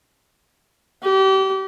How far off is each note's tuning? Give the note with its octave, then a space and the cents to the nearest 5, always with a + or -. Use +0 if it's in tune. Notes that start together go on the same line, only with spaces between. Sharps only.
G4 -30